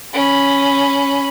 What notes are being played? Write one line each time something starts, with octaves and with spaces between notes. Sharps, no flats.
C#4 B5